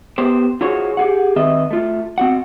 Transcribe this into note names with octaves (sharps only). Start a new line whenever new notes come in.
B3 G4 C5
F4 F#4 G#4 C5 C#5
G4 G#4 F#5
D#3 C4 B4 D#5 E5
A3 F4
C4 F#4 F#5